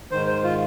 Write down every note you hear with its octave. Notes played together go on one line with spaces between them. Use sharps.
G#2 D#3 C5
C5
F4